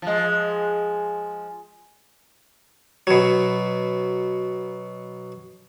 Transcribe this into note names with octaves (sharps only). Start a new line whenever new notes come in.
F3 G#3
B2 F#3